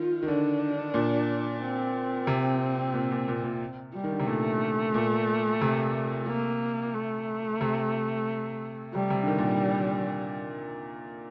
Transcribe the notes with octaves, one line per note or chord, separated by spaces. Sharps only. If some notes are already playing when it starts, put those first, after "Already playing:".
Already playing: D#3 F4
D#3
D3 D4
A#2
C4
C3
A#2
A#2
A#2
A#2
G3
D#3
D3
C3
A#2 A3
A#2
C3
A#3
A3
C3
C3 G3
C3
D3
D#3
A#2